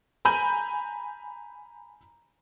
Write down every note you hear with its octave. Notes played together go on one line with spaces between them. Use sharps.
G#5 A#5 B5 G6 D#7